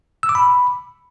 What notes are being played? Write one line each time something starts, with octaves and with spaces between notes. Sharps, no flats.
E6
D6
B5